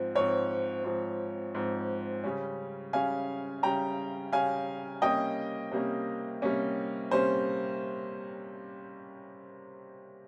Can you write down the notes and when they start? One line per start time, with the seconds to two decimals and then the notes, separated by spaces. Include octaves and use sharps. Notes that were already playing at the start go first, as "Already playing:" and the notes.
Already playing: G#2 F3 C4
0.15 G#2 F3 C4 C#5
0.84 G#2 F3 C4
1.55 G#2 F3 C4
2.24 C#3 G3 C#4
2.93 C#3 G3 C#4 F5 G#5
3.63 C#3 G3 C#4 G5 A#5
4.32 C#3 G3 C#4 F5 G#5
5.02 C3 G3 A#3 C#4 D#5 G5
5.72 C3 G3 A#3 C#4
6.42 C3 G3 A#3 C#4
7.11 C3 G3 A#3 C#4 C5